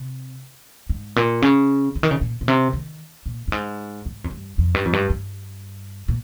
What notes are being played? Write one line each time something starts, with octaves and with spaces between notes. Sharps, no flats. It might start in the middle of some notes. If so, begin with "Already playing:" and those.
Already playing: C3
G#2
A#2
C#3
C#3
D#3
C#3
A#2
A#2
C3
D#3
A#2
G2
G#2
G#2
F2
G2
F2
G2
F2
G2
G2
A#2